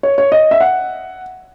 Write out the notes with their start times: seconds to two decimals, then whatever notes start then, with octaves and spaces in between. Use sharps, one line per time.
0.03 C#5
0.18 C#5
0.32 D#5
0.51 E5
0.61 F#5